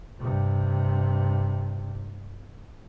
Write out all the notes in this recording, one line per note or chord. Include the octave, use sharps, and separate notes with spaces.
G2 C3